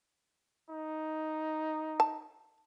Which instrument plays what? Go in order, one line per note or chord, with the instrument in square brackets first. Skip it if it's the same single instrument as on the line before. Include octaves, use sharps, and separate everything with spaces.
[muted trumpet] D#4
[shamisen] A5